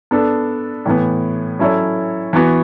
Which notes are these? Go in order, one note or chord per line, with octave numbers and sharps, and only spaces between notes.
B3 D4 A4
A2 E3 B3
F#3 C#4 E4 A4 C#5
E3 B3 F#4